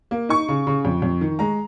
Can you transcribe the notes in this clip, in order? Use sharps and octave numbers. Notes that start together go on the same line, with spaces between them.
A#3
D#4 C#6
C#3
C#3
F2
F2
D#3
G#3 A#5